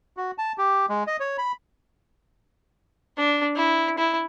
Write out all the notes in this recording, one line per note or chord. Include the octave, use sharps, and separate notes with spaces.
F#4
A5
G4
G#3
D#5
C#5
B5
D4
E4
E4